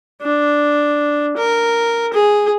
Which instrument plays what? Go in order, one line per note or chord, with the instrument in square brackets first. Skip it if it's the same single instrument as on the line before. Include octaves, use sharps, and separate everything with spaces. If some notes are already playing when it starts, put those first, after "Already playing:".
[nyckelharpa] D4
A#4
G#4